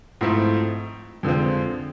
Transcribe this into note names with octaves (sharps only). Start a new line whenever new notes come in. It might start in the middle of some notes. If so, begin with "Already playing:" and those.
G#2 F3 A3 C4 E4
F2 D3 F3 G#3 C4